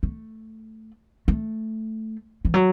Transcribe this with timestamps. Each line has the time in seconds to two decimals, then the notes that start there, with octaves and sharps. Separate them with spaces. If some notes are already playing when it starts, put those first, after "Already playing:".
0.03 A3
1.28 A3
2.45 E3
2.54 F#3